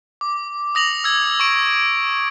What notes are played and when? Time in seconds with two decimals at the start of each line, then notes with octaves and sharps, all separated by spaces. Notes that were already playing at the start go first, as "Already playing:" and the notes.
0.21 D6
0.75 D#6 A#6 F7 F#7
1.04 E6 G#6
1.40 C#6 D7